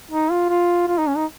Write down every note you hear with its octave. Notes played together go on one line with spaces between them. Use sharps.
D#4
F4
F4
F4
D#4
C#4
D#4